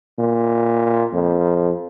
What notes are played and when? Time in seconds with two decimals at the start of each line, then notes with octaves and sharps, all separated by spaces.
0.19 A#2
1.14 F2